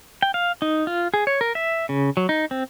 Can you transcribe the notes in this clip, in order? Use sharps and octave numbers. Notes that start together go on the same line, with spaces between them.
G5
F5
D#4
F4
G#4
C#5
A#4
E5
C#3
F#3
D#4
C4